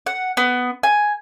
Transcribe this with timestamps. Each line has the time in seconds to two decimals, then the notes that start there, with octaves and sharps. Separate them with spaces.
0.07 F#5
0.37 B3
0.83 G#5